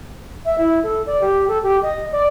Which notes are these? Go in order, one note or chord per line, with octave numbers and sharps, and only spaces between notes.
E5
E4
A4
D5
G4
A4
G4
D#5
D5